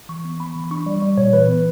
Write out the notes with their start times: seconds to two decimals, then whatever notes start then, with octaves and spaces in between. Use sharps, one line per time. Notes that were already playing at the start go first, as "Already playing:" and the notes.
0.09 E3 C#6
0.25 B3
0.40 B3 B5
0.56 E3
0.64 B5
0.71 D4 C#6
0.86 G3 D5
1.02 G3 D5
1.18 A#2 C#5
1.33 E3 B4
1.48 B3